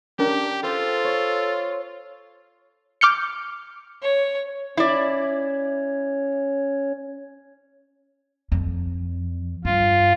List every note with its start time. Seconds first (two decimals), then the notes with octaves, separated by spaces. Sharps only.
0.19 C#4 D4 G4 A#4
0.63 F4 A4 C5
1.04 C#5
3.01 D6 F6 G6 C#7
4.03 C#5
4.77 C#4 E4 C#5 D5
8.52 F2
9.65 G2 F4